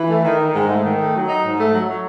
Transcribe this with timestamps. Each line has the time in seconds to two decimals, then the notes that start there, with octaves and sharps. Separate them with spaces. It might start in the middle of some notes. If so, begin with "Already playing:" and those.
Already playing: E3
0.08 A3
0.23 D#3
0.38 D#4
0.53 G#2
0.68 A3
0.83 D#3
0.98 A3
1.13 F#3
1.27 D#4
1.42 G#2
1.58 A3
1.72 F#3
1.87 F#3